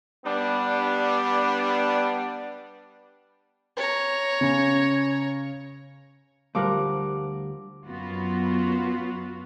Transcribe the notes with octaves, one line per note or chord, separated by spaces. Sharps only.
G3 B3 D4
C#5 A#5
C#3
D2 F3 G3 A#4 F#5 D6
F#2 F#3 B3 F4 F#4